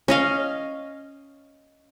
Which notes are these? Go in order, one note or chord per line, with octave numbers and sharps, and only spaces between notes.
C#4 D#5 F5